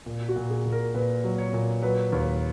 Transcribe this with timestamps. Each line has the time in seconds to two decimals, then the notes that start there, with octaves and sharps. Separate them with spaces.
0.06 A#2
0.29 F#4
0.36 A#2
0.50 G#4
0.65 A#2
0.72 A#4
0.94 A#2 B4
1.24 F#3
1.38 C#5
1.53 A#2
1.82 F#3 B4
2.12 D#2